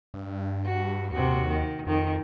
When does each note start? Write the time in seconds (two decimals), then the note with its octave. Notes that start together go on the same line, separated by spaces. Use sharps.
0.14 G2
0.65 F#4
1.11 D#2 C3 F#4
1.47 D#3
1.87 F2 D#3